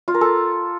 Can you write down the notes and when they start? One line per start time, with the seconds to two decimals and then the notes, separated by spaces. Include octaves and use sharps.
0.08 F4
0.14 A#4
0.21 A4